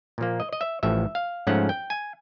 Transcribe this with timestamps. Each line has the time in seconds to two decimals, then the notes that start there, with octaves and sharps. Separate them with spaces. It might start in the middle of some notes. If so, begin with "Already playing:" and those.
0.18 A#2 F3 A#3
0.40 D#5
0.53 D#5
0.61 E5
0.83 A1 A2 F3 E5
1.15 F5
1.47 G#2 F3 A3 C#4 F#5
1.69 G5
1.90 G#5